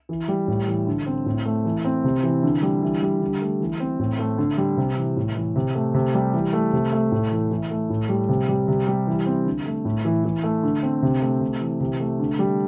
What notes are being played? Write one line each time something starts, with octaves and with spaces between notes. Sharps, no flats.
E3
G3
A2
E3
D3
C4
A2
A3
E3
C4
C3
E3
D3
G3
E3
G3
D3
A3
E3
C4
A2
A3
D3
G3
C3
E3
A2
E3
C3
A3
C3
G3
E3
A3
C3
A3
A2
E3
E3
A3
A2
G3
C3
G3
C3
G3
E3
C4
D3
A3
A2
E3
E3
A3
D3
C4
C3
A3
C3
E3
C3
A3
D3
G3